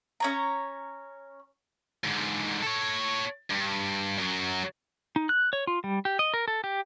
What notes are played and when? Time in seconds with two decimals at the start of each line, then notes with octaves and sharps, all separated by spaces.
0.20 C#4 C#5 A#5
2.04 G#2 D3
2.62 A4 C#5
3.50 G2
4.18 F#2 F#3
5.16 D#4
5.29 F#6
5.53 C#5
5.67 F4
5.84 G3
6.05 G4
6.19 D#5
6.34 A#4
6.48 A4
6.64 G4